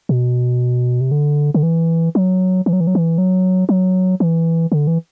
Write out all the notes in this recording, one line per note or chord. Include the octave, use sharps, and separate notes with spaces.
B2
C3
D3
D3
E3
F#3
E3
F#3
E3
F#3
E3
F#3
F#3
E3
D3
E3